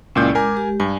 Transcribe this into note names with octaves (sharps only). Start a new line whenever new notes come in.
C#2 A#2 C#4 E4 D5 G6
G#3 A#4 G#5 D6
G#3 G4
G2 G#5